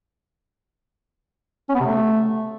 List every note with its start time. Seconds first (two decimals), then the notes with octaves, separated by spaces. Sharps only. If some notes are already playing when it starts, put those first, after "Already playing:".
1.69 C#4
1.75 B3
1.80 C3
1.86 A3